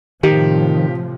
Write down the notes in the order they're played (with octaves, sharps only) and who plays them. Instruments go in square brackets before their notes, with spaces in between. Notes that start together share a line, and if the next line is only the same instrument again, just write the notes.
[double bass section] A2 C3 F3 [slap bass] D#3 [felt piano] G4